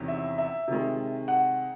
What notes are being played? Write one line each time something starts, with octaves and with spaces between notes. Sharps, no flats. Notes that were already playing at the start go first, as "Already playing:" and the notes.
Already playing: E2 C3 D#3 F#3 C#4
E5
E5
C3 D#3 G#3
F#5